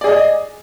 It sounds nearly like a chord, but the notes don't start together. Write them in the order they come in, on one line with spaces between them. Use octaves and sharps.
D5 G#4 D#5